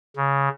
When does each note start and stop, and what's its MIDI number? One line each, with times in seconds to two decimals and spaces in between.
0.16 0.49 49